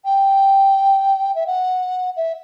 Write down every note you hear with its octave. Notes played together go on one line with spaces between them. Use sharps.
G5
E5
F#5
E5